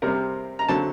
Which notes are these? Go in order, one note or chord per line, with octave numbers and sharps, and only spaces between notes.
C3 G3 C4 A#4
A#5
D3 F#3 C4 A5